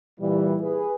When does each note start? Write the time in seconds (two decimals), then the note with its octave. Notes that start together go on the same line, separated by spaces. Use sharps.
0.20 A#2 E3 G3
0.61 G#4 B4